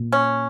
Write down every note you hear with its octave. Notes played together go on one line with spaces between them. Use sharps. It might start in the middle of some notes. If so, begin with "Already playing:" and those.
Already playing: A#2
C#4